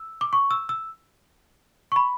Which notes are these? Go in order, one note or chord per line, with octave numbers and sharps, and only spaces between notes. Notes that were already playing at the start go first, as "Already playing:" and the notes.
Already playing: E6
D6
C#6
E6
E6
C#6
B5